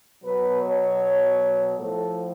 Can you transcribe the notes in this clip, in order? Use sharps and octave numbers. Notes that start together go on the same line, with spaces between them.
B2 F#3 B4
C#5
A2 F3 A4